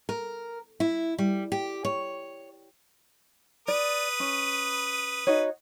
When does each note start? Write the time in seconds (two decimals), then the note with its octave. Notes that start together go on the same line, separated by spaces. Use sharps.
0.09 A#4
0.80 E4
1.18 G3
1.52 G4
1.85 C#5
3.68 B4 D5 D#6
4.20 C#4
5.27 D#4 F#4 C#5